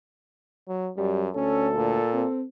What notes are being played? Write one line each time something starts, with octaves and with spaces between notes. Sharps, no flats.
F#3
F#2 G3
D2 C#4 A4
A#2
C4